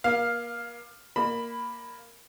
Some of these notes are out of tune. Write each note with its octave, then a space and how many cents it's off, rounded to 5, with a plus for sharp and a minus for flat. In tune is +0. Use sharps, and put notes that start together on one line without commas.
A#3 +30 F5 +0
A#3 +0 D#5 -45 B5 +0